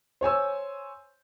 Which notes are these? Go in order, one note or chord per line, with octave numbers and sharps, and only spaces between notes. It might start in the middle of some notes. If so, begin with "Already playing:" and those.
C5 C#5 G#5 E6